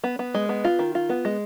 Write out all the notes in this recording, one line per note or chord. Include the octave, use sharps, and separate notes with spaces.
B3
B3
G#3
B3
F4
D#3
F4
B3
G#3